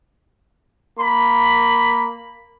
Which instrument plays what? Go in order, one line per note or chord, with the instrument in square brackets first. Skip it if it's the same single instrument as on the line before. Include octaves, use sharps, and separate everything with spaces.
[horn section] A#3 B5